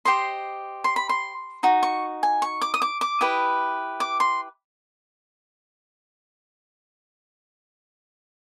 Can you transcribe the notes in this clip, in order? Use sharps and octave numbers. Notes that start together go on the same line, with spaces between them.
G4 C5 D#5 C6
C6
B5
C6
D#4 F#4
C#6
G#5
C#6
D6
D#6
D6
D6
E4 G4 B4 D#6
D6
C6